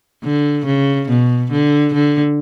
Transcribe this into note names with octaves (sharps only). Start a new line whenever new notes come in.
D3
C#3
B2
D3
D3